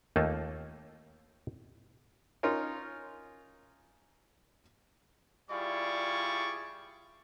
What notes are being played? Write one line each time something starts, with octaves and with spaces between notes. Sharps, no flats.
D#2 A3 A#3 D#4 F4 A5
C#4 D#4 F4 A#4
G3 E4 F4 G#4 D5 C#6